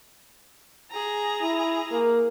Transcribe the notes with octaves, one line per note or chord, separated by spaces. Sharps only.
G#4 A#5
E4
A#3